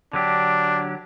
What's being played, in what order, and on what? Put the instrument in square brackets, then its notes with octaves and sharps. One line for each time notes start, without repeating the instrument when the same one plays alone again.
[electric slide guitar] D3 F#3 G4 [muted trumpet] D4